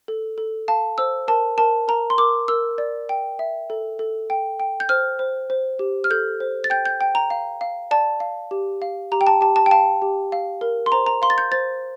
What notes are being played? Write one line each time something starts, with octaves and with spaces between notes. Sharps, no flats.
A4
A4
F5 A5
C5 E6
A#4 A5
A#4 A5
A#4 A#5
C6
A#4 D6
A#4 E6
D5
G5
E5
A4
A4
G5
G5
G6
C5 F6
C5
C5
G4
F6
A4 G6
C5
A6
G5 G6
G6
G5
A#5
F5
F5
D5 A5
F5
G4
F5
G4 A#5
G5
A5
G4 A5
A5
G5
F5 A5
G4
F5
A#4
C6
C5 A#5
A#5
F5 C6
A6
G6
C5 A6